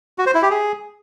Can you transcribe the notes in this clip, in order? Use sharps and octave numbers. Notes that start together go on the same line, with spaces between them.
F#4
C5
E4
G4
G#4